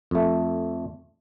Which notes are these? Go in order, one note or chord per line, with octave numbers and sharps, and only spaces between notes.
F2 A3